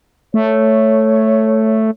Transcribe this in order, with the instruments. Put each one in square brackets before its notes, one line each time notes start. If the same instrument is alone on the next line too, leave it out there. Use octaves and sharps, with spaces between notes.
[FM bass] A3 [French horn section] C#5